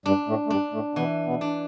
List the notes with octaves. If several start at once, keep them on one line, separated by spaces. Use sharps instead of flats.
G2 G3 D4
A2 A3
A3
G2 G3 D4
A2 A3
B2 E3 B3
B2 B3
D4